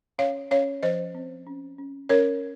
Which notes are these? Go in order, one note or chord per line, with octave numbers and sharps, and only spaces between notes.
C#4 C#5 F5
C#4 C#5 F5
F3 C5 D#5
C4
C#4
C#4
C#4 A#4 C#5